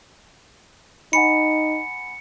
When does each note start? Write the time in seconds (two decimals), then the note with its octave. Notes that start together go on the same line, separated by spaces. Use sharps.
1.13 D#4 F#5 G#5 B5 C#7